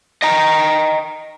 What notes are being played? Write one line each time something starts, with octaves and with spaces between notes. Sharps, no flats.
D#5 G5 A#5